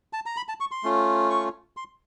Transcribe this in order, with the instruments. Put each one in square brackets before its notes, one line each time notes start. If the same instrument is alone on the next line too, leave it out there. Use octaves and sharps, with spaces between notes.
[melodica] A5
A#5
B5
A5
C#6
C6
A3 C#4 F4
C#6
C6